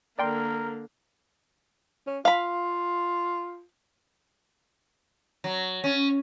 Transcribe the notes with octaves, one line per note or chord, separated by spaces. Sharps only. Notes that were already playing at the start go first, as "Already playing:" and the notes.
D3 A#3 A#4 D5 G5 C6
C#4
F4 F5 B5
F#3
C#4